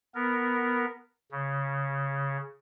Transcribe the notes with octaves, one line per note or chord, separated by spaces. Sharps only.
B3 A#4
C#3